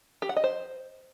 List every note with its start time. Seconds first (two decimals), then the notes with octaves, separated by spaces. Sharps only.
0.22 G4
0.29 F#5
0.36 D#5
0.44 C5